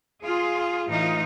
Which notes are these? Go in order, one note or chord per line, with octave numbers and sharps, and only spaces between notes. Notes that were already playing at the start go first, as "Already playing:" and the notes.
F4 G#4
A2 E3 D#4 F4